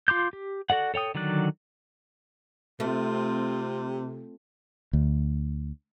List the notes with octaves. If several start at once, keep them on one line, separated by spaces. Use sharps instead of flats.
F4 C6 D6 G6
G4
F#4 A4 D5 F#5
A4 C#5 G5 D#6
D3 D#3 F#3 D5 F#6
C3 A3 C4 F4
D2